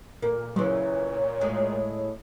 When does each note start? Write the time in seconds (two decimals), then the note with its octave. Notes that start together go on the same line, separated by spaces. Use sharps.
0.22 A#2 A#3
0.56 C#3 E3 F#3 C#5
1.41 A2 G#3